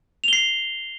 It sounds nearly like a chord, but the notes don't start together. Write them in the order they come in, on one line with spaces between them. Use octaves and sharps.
F7 G7 C7